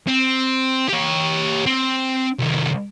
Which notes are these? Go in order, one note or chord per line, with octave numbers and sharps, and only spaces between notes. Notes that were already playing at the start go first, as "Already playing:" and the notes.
C4
G4 C#5
C4
C2 D#3